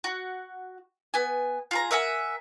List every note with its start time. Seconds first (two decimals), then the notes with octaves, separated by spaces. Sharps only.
0.04 F#4
1.14 B3 G#5
1.71 F4 G#4 A#5
1.91 A#4 E5 F#5 G#5